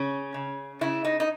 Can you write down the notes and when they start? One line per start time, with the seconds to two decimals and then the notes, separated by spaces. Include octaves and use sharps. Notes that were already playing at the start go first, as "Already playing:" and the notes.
Already playing: C#3 C#4
0.34 C#3
0.81 C#3 E4
1.05 D#4
1.20 D#4